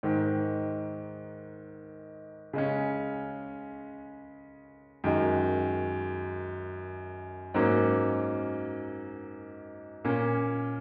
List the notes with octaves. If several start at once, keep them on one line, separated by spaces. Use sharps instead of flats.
G#2 D#3 G#3
C#3 G#3 C#4
F#2 D#3 G#3
G#2 F#3 A#3 C#4
A#2 A#3 C#4